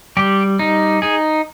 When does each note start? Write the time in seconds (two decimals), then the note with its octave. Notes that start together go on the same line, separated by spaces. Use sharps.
0.17 G3 G4
0.59 D#4
1.02 D#4 G#4